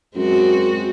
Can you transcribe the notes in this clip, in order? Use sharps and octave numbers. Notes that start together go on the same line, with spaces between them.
F#2 G#3 C4 F#4